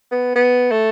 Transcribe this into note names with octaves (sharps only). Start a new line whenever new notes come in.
B3
B3
A3